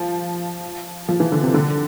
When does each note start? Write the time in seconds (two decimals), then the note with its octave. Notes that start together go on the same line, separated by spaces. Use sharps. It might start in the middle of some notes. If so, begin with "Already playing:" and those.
Already playing: F3
1.09 F3
1.20 E3
1.32 D3
1.43 C3
1.54 D3